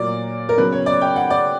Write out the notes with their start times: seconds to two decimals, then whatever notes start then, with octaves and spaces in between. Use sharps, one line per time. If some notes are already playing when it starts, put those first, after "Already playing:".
Already playing: A#2 F#3 A#3 D5
0.49 A#4
0.58 C#3 F#3 B3 B4
0.72 C#5
0.86 D5
1.01 G5
1.16 F#5
1.30 D5